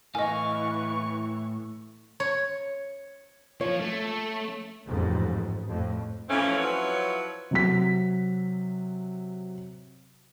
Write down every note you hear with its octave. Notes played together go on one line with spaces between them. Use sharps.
A2 E3 D#5 F5 G#5 C#6
C#5
F3 F4 C#5
A3
A1 F2 G#2
F2 A2
E3 F3 A3 C4 C#4
F3 F#3 E4 B4 C#5
C3 F#3 B6